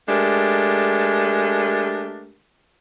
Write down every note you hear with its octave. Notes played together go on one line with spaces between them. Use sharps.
G#3 A3 D4 G4 A#4